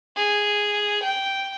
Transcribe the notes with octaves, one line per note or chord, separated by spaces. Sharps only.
G#4
G5